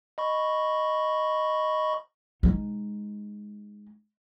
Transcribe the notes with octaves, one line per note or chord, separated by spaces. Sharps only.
D#5 B5 C#6
G#3 D#4